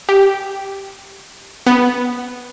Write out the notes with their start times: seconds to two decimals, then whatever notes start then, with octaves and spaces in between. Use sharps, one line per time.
0.09 G4
1.66 B3